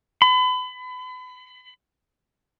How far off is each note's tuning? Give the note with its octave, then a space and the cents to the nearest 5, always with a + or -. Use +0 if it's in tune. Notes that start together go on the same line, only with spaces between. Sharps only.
B5 +35